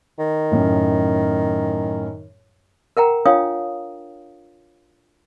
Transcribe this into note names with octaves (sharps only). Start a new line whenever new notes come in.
D#3
F#2 A2
A#4 F#5 G5 A#5
D4 F4 C#5 F5 G5 D#6